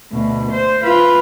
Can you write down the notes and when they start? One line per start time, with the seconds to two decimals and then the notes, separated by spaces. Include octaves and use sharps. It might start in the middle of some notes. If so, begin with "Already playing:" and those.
0.12 D2 B2
0.52 C5
0.83 F4 B4